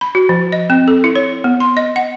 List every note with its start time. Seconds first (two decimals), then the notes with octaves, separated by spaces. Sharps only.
0.01 B5
0.15 F#4
0.29 F3
0.52 D#5
0.70 C4
0.88 A4
1.04 E4
1.16 C#5
1.44 B3
1.60 C6
1.77 D#5
1.96 F#5